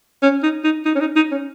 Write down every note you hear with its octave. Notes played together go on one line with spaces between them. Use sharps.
C#4
D#4
D#4
D#4
C#4
D#4
D#4
C#4